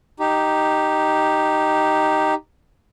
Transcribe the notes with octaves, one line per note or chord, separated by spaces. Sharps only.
D#4 G4